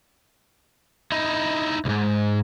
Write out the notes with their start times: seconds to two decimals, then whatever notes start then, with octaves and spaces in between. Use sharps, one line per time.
1.12 D#4 E4
1.85 C2 G#2